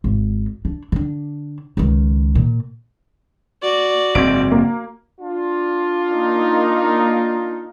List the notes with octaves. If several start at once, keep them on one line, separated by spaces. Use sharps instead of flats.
G#1
D4
D3 D4
C#2 D#3
A#2
F#4 D5
F#1 G#2 C4 D7
A#3
D4 F4
A#3 D#4